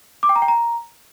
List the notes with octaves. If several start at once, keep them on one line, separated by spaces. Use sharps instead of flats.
D6
G5
A#5
G5
A#5